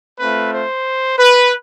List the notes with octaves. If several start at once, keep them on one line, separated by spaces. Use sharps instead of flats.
A3 C4 F4 B4
C5
B4